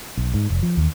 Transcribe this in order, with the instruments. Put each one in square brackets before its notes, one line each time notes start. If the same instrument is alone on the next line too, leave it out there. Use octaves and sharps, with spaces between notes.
[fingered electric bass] B1
G#2
F1
F3
D#2